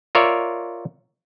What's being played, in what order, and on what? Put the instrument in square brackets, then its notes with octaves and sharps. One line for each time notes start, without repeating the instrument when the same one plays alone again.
[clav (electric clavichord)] F4 A#4 C#5 D5 E5